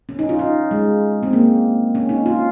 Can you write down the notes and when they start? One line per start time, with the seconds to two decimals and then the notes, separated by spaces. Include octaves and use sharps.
0.09 C#4
0.19 D#4
0.29 F4
0.39 D#4
0.71 G#3
1.23 C4
1.33 A#3
1.95 C#4
2.09 D#4
2.26 F4